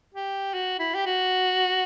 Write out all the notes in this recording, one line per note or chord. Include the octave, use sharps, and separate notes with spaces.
G4
F#4
E4
G4
F#4